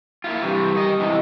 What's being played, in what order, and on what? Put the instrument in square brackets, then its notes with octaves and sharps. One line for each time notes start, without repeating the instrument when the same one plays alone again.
[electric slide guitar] A#3 E4 F4
[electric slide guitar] C3 E3 [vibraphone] G3 G4 C#6
[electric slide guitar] D#3 D#5
[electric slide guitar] G#2 C3 E3 [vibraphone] E4 D#5